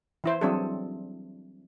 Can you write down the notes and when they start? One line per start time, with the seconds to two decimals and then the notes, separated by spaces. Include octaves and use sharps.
0.24 E3 E4 C5
0.41 F#3 G3 C4 D4 G#4 A4